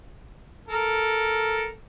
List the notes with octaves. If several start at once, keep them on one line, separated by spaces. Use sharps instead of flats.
A4 A#4